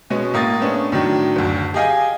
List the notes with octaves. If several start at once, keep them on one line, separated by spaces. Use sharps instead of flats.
B2 G#3 B3 C#4
A2 A#3 D#6 A6
G#3 A3 B3 C#4 D4
A2 D#3 F#3 D4
F#1 D2
G4 G#4 D#5 F5 G5 G#5